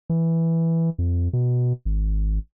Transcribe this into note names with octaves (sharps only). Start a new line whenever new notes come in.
E3
F2
B2
G#1